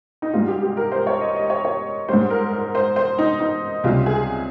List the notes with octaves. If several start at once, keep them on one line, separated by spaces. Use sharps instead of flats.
D#4
G#2 G3 F4
G4
G4
A#4
C5
C#5
D#5
D#5
C#5
C#5
G#2 G3 C5
A#4
A#4
C5
C5
D#4
D#4
C#2 C3 G3 F4
G#4